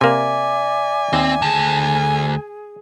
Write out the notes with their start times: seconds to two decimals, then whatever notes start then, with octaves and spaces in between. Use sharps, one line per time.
0.01 C3 A#3 D5 E5 G#5 D6
1.13 D#2 C4
1.42 D2 G#4 A5